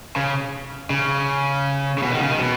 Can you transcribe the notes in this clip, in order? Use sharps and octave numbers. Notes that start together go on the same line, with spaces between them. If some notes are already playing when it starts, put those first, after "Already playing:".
C#3
C#3
C#3
B2
D#3
C#3
D#3
B2